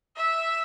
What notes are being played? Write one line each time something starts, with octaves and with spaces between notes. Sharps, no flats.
E5